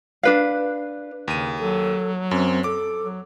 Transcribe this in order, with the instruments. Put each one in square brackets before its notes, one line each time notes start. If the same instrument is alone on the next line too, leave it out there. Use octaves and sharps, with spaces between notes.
[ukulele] D4 B4 F5
[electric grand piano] D#2 D#7 [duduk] C#3
[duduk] F#3 [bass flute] A4
[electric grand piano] F#2 [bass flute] C4
[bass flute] A4 [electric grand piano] D6
[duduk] F#3